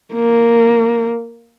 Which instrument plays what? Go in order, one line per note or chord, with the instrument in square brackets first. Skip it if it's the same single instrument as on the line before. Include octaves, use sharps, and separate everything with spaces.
[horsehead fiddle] A#3